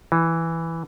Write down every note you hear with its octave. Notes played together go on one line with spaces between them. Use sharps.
E3